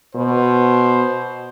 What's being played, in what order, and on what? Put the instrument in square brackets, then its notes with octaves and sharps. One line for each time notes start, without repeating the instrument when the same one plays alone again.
[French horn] B2 [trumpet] C5